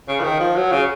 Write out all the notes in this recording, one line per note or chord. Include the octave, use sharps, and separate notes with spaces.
C#3
F3
D#3
F3
F#3
C#3